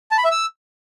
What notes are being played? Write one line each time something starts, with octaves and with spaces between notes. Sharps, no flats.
A5
B5
E5
E6